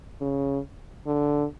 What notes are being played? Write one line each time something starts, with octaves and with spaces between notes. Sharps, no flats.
C#3
D3